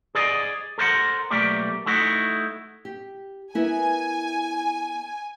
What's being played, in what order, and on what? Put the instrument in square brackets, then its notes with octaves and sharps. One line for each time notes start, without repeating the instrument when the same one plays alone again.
[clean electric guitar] G#4 D5 D#5
A4 A#4 C5 D#5 F#5
B1 G3 A3 A#3 G4 D5
A3 D#4 E4 F#4
[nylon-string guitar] G4
[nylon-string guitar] B3 E4 A#4 [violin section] G#5